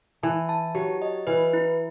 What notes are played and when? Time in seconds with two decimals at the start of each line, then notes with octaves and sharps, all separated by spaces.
0.23 E3 A5
0.49 A5
0.75 F#3 G4
1.02 D#5
1.27 E3 B4
1.53 E4